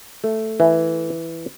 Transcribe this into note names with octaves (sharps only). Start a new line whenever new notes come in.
A3
E3